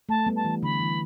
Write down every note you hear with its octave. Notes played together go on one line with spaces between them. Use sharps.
A3 A5
G3 B3
A5
E3
D3 B5
E3